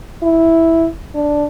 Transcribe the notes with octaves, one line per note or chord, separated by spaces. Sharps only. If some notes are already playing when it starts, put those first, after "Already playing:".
E4
D4